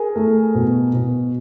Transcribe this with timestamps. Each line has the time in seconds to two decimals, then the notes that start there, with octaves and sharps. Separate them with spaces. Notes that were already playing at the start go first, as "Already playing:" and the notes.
Already playing: G#4 A#4
0.16 A3
0.55 B2
0.94 B2